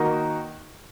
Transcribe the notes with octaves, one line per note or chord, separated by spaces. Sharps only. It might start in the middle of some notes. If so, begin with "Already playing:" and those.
Already playing: D#3 A#3 D#4 F#4